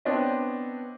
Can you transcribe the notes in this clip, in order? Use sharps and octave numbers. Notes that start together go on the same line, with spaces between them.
B3 C4 D4 C#5 D#5